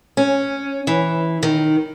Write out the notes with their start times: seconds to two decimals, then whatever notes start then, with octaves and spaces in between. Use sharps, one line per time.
0.17 C#4
0.87 E3
1.43 D#3